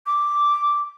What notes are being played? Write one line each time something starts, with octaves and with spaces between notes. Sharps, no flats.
D6